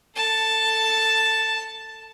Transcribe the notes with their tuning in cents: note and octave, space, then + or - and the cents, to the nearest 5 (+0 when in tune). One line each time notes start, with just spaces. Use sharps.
A4 +20 A5 +0